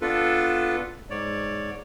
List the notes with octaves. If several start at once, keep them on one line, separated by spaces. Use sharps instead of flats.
B3 D4 F4 A4 B4
G#2 C#5 D5